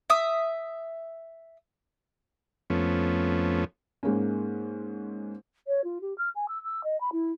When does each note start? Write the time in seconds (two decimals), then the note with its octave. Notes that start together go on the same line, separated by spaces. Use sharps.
0.10 E5 D#6
2.70 F2 F3 A3 B3 C#4
4.03 G#2 G#3 A#3 C#4
5.67 C#5
5.84 F4
6.01 G4
6.18 F6
6.35 G#5
6.48 E6
6.63 E6
6.84 D#5
7.00 B5
7.12 E4